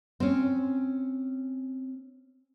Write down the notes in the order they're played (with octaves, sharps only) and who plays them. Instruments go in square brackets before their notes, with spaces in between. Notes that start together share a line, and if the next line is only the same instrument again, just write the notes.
[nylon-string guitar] C4 C#4